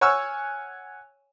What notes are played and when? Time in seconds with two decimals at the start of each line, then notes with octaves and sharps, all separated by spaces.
0.01 C#5 F#5 G#5 C#6 E6 F6